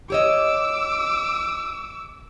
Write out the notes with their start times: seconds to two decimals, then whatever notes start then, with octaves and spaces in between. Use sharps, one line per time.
0.10 G4 C#5 D#5 D6 E6